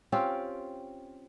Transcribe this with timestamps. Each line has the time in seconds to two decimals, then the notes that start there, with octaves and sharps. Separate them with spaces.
0.12 C4 C#4 F4 G4